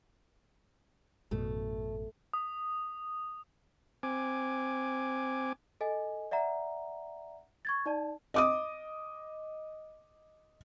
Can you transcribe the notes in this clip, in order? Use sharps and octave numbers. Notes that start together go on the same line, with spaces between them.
A1 F#2 B2 A3
D#6
C4 G#5 D6
A4 D#5 G#5
D5 E5 F#5 A#5
C#6 G#6 A6
D#4 D5 A5
D#5 D6 D#6